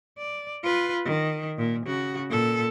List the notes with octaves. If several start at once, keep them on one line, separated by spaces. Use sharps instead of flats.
D5
F4 B4
D#3
A#2
C#3 F#4
A#2 A4